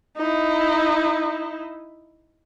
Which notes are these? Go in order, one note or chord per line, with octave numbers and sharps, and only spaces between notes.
D#4 E4